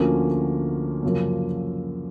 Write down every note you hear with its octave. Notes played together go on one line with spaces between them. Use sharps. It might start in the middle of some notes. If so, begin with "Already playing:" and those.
Already playing: D2 D3 F3 A#3 C#4
F#2 C#3 F3 A#3